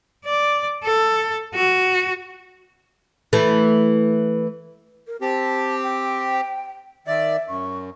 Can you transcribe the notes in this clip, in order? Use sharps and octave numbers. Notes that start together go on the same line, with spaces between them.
D5
A4
F#4
E3 A3
A#4
C4 G4 A5
G5
D#3 D5 E5
F#2 C#6